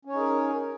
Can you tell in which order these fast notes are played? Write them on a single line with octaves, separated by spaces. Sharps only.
C#4 C#5 D#4 G#4 A#4